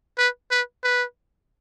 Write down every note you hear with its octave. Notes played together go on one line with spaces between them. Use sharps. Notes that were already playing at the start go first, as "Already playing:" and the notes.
B4
B4
B4